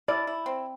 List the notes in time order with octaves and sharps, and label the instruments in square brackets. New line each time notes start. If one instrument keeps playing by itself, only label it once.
[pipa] E4 [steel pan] D5
[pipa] E4
C4